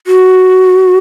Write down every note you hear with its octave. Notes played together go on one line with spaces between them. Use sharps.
F#4